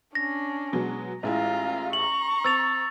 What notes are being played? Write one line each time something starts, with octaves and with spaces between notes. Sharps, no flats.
C#4 D4 A#6
B2 F#3 G#3
A1 G#3 E4 F4 A#5
A#5 C#6 F#7
C4 E6 A6 F7